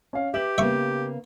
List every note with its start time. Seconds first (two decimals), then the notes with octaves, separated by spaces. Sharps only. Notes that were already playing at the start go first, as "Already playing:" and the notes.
0.13 C#4 C#5 F5
0.34 G4 B4 E5 D6 F#7
0.58 C#3 A#3 B3 E5 C#6